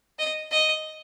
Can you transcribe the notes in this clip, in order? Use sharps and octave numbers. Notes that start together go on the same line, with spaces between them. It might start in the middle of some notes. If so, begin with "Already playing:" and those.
D#5
D#5